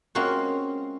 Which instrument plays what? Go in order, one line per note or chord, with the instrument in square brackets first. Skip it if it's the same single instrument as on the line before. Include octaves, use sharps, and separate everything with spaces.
[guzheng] G#3 A#3 C4 C#4 F4 F#4